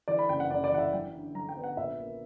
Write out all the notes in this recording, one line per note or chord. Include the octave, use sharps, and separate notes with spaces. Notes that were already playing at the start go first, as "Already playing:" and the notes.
E3 D5
B5
F#1 G5
F#5
F#2 D5
D5
E3 F#5
E5
F#3 G5
D3
F#3 A#5
G5
B3
F#5
A#1 E5
A#3